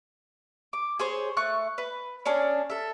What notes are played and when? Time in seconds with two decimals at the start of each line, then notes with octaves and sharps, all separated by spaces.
0.73 D6
0.99 G#4 C5 C#5
1.37 A3 C#6 F#6
1.78 B4
2.26 C#4 D4 G#4
2.70 A4 E5